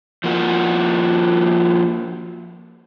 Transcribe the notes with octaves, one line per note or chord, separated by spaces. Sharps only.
F3 A#3 F#4